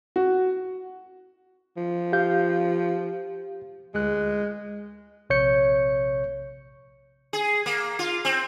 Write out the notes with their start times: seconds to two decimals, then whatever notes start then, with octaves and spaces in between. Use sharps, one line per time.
0.16 F#4
1.77 F3
2.13 G4 F5 G6
3.94 D2 G#3 F#6
5.30 A#1 C3 C#5 G6 C#7
7.33 G#4
7.66 A#3
7.99 F4
8.25 C4